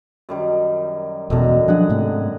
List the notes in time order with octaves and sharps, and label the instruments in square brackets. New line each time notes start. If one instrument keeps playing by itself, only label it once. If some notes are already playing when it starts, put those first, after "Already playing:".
[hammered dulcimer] F#2 D#3 G3
[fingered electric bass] E1 B2 [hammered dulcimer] F#2 D3 D#3
[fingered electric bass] F3 F#3 D4 [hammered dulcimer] G#4 F#5
[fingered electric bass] G#2 C3 A3